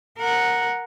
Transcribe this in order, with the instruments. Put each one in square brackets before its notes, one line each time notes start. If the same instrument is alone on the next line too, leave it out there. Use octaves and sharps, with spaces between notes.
[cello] A#4 F#5